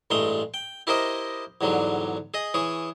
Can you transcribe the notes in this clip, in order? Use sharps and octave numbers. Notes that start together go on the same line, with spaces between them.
A1 G2 G#3 A3 C6
G5
E4 G4 A#4 C5 D#5
E2 G#2 D3 F#3 G3
G#4 D#5
E3 G#4 C#5